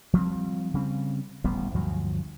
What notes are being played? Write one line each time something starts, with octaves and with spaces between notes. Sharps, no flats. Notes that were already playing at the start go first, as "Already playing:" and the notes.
F3 G3 A3 C4
C#3 G3 C4
D#1 A1 G3 B3
D2 G2 F3 F#3